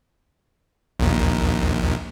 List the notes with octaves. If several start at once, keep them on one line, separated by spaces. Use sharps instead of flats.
A#1 D#2